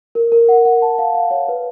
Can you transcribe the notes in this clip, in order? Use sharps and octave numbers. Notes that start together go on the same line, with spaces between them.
A#4
A#4
F#5
F#5
A5
F5
F5
C#5
B4